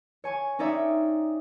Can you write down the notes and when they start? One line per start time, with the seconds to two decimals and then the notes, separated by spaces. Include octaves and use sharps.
0.24 C#5 G#5 C#6
0.59 C#4 D#4 C#5 D5 E5 G5